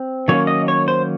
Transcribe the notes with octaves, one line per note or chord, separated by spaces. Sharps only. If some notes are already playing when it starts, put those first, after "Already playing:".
Already playing: C4
D#3 F#3 A#3 C#4 C#5
D#5
C#5
C5